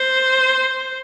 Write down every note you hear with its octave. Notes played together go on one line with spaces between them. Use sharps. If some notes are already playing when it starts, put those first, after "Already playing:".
Already playing: C5